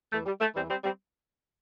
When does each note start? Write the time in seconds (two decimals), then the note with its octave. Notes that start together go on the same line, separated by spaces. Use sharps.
0.12 E2 E3 A3
0.26 G3
0.41 A3
0.55 E2 E3 G3 C4
0.70 G3 C4
0.84 G3 C4